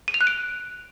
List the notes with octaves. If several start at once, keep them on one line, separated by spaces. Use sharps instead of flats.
D#7
F7
F#6
D7